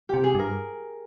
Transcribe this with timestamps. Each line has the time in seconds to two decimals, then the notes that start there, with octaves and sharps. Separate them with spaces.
0.09 C3 G4
0.24 G#4
0.35 G2 A#4